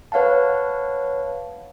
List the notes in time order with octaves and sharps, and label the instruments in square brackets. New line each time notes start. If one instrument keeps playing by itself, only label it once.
[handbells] B4 C#5 F5 F#5 A5